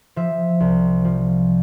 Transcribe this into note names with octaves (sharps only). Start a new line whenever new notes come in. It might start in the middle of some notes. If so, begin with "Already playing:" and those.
F3 E5
C2
F3